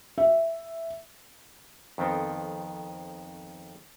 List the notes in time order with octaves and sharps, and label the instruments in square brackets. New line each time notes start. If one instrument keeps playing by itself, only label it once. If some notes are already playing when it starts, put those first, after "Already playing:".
[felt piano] E5
[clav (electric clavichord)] F2 D#3 B3 C4 A4